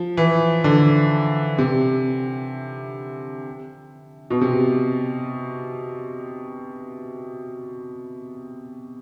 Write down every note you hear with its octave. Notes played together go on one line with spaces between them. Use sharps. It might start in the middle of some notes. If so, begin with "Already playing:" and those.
Already playing: F3
E3
D3
C3
B2
C3